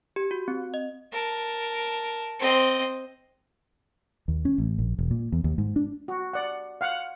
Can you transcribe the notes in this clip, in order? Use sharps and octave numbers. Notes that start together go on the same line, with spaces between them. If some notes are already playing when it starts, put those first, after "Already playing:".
G4
F#4
C4
D#5
A#4 A5
C4 D#5
D#2
C#4
A1
A#1
E1
A#2
E2
D#2
G#2
D4
F#4
D5 F#5
F5 F#5